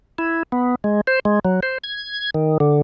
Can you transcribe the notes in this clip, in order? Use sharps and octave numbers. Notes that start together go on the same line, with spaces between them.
E4
B3
G#3
C5
G#3
F#3
C5
G#6
D#3
D3